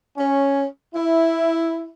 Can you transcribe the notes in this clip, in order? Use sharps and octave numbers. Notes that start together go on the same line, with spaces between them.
C#4
E4